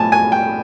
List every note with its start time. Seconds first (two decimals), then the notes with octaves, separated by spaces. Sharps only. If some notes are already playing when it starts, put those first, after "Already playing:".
Already playing: B1 A2 F3 G#5 A5
0.12 G#5
0.32 G5